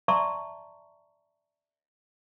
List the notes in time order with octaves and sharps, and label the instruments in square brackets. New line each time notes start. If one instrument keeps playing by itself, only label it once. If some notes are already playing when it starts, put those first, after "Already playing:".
[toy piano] D5 E5 A5 A#5 C6 C#6